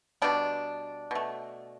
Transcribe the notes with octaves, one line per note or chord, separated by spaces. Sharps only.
B2 G3 B3 D4
B2 A3